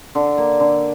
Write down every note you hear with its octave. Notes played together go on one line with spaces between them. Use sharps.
D3
A#3
D3